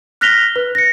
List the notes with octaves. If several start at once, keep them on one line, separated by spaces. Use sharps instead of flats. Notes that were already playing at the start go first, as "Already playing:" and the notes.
F6 F#6 A#6 B6 F7 G7
B4
A#6 C#7